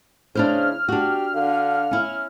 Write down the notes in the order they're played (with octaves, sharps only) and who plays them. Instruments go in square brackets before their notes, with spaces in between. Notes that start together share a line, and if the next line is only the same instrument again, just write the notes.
[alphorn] C#3 [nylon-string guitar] D4 E4 C5 [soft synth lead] F6
[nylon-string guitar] D4 F#4 [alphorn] G4
[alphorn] D3 [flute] F5
[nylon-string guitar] C#4 E4